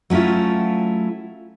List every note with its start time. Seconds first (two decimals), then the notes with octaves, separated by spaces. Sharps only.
0.10 F#3 A3 C#4 E4 F4